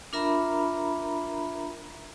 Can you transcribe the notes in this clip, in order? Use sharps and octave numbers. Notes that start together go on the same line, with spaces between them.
D4 F4 A#4 E5 A#5 B5